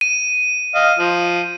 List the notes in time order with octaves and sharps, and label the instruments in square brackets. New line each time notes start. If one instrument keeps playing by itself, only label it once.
[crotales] D#7
[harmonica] D#5 F5
F3